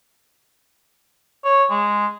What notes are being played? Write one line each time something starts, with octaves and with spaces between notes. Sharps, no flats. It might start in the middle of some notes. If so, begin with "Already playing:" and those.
C#5
G#3